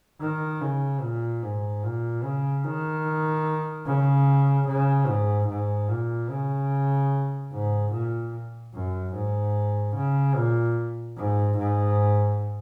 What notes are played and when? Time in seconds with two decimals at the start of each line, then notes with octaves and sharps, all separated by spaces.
0.21 D#3
0.61 C#3
1.01 A#2
1.42 G#2
1.84 A#2
2.23 C#3
2.64 D#3
3.86 C#3
4.67 C#3
5.07 G#2
5.48 G#2
5.89 A#2
6.30 C#3
7.52 G#2
7.92 A#2
8.73 F#2
9.13 G#2
9.95 C#3
10.36 A#2
11.17 G#2
11.58 G#2